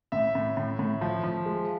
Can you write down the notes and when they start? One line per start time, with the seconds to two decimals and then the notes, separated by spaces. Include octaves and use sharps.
0.12 A2 E5
0.35 A2
0.57 A2
0.79 A2
1.01 F3
1.24 F3
1.46 G#3